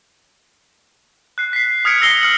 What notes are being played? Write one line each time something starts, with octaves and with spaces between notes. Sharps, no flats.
F#6 C7
B6 C7
D#6 F6 G#6 B6 C#7 D7
E6 A#6 C7 G7
F6 C#7 F#7